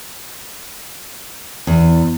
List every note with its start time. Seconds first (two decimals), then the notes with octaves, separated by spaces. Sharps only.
1.67 E2